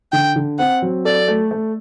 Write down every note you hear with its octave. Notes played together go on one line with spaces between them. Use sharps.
D3 G5
D3
C4 F#5
F#3
A4 D5
A3
A3